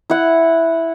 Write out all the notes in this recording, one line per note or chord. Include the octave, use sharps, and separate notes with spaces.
E4 F#5